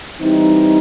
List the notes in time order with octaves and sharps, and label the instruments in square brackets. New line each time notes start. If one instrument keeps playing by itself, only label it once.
[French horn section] E3 G3 C4 D#4